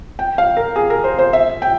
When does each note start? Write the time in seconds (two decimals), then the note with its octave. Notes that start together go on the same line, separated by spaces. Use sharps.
0.19 G5
0.38 F5
0.57 A#4
0.76 G#4
0.90 A#4
1.04 C5
1.19 C5
1.33 E5
1.62 G5